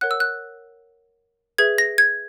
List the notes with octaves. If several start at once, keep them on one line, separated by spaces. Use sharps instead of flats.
A#4 C#5 F#5 F#6
E6
F#6
G#4 B4 E5 G#6
A#6
G#6